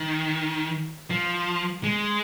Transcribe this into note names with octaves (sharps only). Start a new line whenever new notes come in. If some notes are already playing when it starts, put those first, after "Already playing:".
Already playing: D#3
F3
G#3